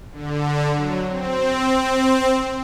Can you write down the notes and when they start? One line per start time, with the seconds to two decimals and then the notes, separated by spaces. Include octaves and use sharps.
0.12 D3
0.75 F#3
1.09 C4